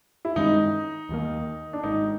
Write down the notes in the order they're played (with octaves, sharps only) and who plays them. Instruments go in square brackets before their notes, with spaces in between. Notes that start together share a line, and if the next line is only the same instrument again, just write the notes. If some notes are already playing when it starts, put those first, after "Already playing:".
[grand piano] E4
[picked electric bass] G2 D#3 G#3 C#4 [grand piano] D#4
[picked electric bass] D#2 D#3 G3 A#3
[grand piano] D4
[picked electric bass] G#1 G#2 D#3 [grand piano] D#4